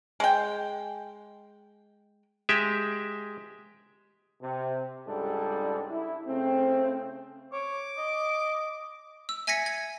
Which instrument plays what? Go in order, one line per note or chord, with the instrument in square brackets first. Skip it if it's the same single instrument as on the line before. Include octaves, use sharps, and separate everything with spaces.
[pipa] G#3 G5
[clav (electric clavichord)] G#3 G4 E5
[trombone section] C3
C#2 G#2 G3 D4 A4
E4
C#3 A3 C4
[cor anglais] C#5 [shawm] D6
[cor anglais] D#5
[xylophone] E6
E5 G#5 G#6 A#6 B6 C#7
G#6